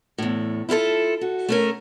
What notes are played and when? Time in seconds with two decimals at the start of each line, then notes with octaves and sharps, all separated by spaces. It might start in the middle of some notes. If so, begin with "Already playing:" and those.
0.18 E2 A2
0.69 E4 F4 G#4 A4
1.21 F#4
1.49 A3 C#4 A#4